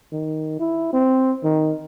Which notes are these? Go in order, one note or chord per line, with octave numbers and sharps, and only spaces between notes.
D#3
E4
C4
D#3